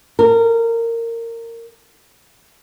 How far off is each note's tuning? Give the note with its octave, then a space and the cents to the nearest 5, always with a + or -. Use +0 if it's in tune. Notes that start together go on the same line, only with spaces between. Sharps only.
A#4 -20